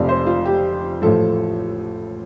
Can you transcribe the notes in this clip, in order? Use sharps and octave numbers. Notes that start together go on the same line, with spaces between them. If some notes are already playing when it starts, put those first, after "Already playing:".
Already playing: F1 F2 C3 F3 D5
C5
F4
G4
A1 A2 F3 A4